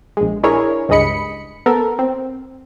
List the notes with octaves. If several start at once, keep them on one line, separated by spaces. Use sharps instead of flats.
A#1 G#3
D4 E4 G#4 A#4 C#5
C#2 G2 G#3 D#5 B5 C#7
B3 A4 A#4
C4